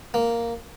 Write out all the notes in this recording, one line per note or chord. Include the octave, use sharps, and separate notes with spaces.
A#3